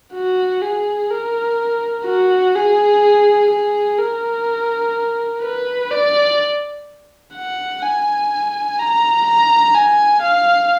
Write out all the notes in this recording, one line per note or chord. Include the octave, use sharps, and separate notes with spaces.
F#4
G#4
A#4
F#4
G#4
G#4
A#4
B4
D5
F#5
G#5
A#5
A#5
G#5
F5